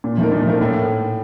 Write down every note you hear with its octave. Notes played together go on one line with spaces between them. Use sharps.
A#2
F3 A3 D#4 A#4
A#2
F3 A3 D#4 A#4
A2